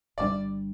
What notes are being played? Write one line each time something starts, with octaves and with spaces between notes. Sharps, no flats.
G1 G2 G3 D4 D5